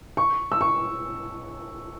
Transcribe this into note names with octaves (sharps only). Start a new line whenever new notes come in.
C#6
E6
C#6